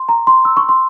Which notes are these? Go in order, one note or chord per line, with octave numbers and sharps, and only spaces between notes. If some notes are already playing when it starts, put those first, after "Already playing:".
Already playing: C6
A#5
C6
E6
C#6
C6